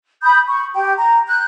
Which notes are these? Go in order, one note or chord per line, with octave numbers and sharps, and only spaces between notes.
B5 D#6 G6
C#6
G4 G5
A#5
F#6 G6